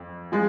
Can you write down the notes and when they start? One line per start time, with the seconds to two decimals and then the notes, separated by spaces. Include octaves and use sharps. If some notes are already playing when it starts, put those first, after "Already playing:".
Already playing: F2
0.32 F3 G#3